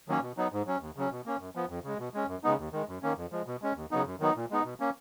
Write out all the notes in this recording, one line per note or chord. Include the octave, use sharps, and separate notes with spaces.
D#3 F#3 A#3 C#4
B2
F#3 B3 D#4
G#2
F#3 C#4
D#2
C#3 F#3 C#4
B2
A#3 C#4
F#2
F3 B3
F2
C#3 G#3
B2
G#3 C#4
F#2
C#3 G#3 B3 D#4
D#2
D#3 G#3
F#2
D#3 A#3 C#4
F2
F3 G#3
B2
G#3 C#4
D#2
C#3 F#3 B3 D#4
F#2
D#3 F#3 B3 D#4
A#2
G#3 B3 D#4
B2
A#3 C#4